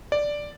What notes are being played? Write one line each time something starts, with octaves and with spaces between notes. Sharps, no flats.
D5